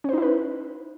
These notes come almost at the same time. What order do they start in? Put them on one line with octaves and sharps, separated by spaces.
C#4 C5 D#4 E4 B4